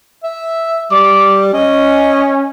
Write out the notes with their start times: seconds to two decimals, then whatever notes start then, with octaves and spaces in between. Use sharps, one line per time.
0.24 E5
0.91 G3 D6
1.54 C#4 D#5